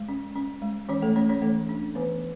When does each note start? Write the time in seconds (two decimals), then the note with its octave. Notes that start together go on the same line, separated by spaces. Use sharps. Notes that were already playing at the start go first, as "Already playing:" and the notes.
Already playing: G#3
0.09 C#4
0.36 C#4
0.62 G#3
0.89 E3 C#4 C#5
1.02 A3 A4
1.16 A3 C#4 C#5
1.29 C#4 C#5
1.42 E3 A3 A4
1.69 D4
1.95 E3 B3 B4